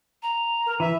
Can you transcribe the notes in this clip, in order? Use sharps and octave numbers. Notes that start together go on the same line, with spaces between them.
A#5
A#4
E3 E5